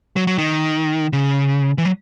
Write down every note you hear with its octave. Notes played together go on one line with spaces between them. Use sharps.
F#3
F#3
D#3
C#3
E3
F#3